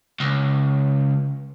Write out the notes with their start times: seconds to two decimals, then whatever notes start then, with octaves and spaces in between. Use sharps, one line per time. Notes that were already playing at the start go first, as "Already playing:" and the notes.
0.20 C#2